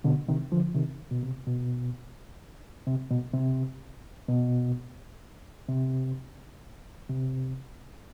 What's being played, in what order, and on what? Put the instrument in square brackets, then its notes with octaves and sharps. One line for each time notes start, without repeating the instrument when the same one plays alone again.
[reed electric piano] B2 D3
C3 D#3
D3 F3
C3 D#3
B2
C3
B2
C3
B2
C3
B2
C3
C3